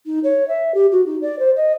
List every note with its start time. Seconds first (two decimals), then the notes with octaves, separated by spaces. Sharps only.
0.06 D#4
0.23 C#5
0.48 E5
0.74 G4
0.92 F#4
1.06 D#4
1.21 D5
1.39 C5
1.56 D#5